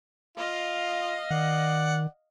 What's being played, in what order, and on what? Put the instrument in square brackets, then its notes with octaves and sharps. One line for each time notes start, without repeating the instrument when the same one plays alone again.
[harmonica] F4 [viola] D#5 F5
[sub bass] D#3 [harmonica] D5 F#5